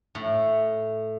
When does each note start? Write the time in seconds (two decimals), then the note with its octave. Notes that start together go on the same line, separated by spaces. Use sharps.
0.15 A2